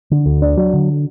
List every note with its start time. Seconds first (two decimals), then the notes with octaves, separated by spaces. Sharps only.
0.11 D3
0.26 D2
0.42 D4
0.57 F#3
0.74 D3